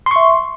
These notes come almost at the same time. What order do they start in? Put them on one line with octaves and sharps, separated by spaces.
C6 C#6 E5